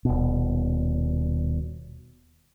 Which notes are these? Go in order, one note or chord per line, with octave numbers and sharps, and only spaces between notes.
D#1 B2